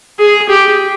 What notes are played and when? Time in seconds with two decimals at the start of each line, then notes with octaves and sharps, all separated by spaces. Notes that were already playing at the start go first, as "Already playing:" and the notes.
0.19 G#4
0.49 G4